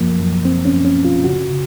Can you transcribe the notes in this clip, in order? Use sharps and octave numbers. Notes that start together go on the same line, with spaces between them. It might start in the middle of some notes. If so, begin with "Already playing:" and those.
Already playing: F#2 F3 A#3
F#2
F#2 C4
C#4
F#2
C#4
F#2
F4
C#3 F#4
C#3